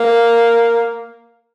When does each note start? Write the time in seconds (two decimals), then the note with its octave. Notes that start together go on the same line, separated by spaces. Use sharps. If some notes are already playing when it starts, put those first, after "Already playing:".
Already playing: A#3